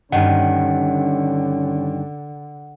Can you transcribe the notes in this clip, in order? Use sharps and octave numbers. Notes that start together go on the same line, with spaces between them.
G2 D3 D#3 C#4 F#5